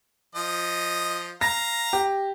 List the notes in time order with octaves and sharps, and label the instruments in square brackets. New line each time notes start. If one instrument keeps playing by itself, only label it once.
[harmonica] F3 D#5
[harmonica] F5 A#5 [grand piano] A#6
[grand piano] G4